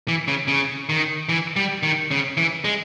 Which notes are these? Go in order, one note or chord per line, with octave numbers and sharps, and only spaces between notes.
E3
C#3
C#3
D#3
E3
G3
D#3
C#3
E3
G#3